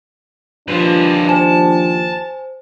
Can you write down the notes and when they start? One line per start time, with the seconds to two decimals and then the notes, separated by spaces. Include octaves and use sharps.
0.68 D#2 F3 D4 F4 G4 B4
1.29 C5 G#5 A5